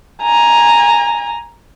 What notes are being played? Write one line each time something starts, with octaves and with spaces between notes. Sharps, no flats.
G#5 A#5